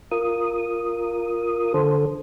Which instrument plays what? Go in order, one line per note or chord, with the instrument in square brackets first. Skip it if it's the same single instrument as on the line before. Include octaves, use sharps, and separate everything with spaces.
[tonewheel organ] F4 A#4 D#6
D3 A4 C5